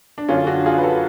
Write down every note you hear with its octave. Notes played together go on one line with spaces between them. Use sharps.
D4
F#2 D3 F#3 C#4 F4
D4 F#4
F4 G#4
B4
F#4 A4